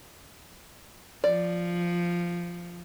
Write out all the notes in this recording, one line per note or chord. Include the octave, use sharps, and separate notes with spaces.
F3 D5